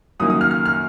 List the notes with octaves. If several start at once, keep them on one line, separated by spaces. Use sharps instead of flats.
F#2 D#3 A#3 D#6
D#6
F6
F6
F6